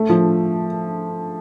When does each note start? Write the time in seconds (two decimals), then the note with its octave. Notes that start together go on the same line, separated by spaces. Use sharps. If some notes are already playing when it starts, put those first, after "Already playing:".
Already playing: A3
0.09 F3